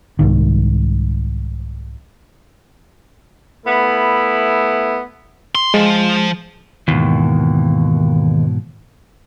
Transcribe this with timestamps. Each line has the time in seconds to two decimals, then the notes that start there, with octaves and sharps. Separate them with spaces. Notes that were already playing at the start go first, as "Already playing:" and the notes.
0.19 C2 G#2 D#3
3.66 A3 B3 E4
5.55 C6
5.74 F3 G#3
6.88 D#2 G#2 B2 E3